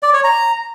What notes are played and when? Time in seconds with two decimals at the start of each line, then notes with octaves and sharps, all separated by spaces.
0.03 D5
0.13 C#5
0.24 A#5